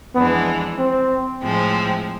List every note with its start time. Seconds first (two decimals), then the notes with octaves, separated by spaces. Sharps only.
0.15 F2 E3 G#3 B3 D4
0.78 C4
1.42 A2 F3 G#3 C4